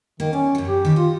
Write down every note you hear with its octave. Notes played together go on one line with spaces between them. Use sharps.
D#3 A#3
C#4 D5
F#2 F#3
G4
D#3 B4
F4 D#5